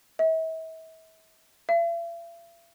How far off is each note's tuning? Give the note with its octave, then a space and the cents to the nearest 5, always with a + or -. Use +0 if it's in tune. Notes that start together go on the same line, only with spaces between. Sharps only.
E5 -40
E5 +45